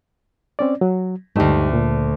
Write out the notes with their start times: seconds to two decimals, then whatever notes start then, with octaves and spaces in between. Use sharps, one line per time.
0.59 C4 C#4 D5
0.81 F#3
1.36 D2 G2 A3 D#4 G4
1.73 A#2